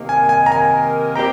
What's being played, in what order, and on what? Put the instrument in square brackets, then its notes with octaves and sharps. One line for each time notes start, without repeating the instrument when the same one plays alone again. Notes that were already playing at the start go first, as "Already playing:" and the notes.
Already playing: [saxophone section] C3 D#3 A#3
[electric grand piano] G#5
G#5
A#5
G#5
[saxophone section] F3 C4 G4 [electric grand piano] A#5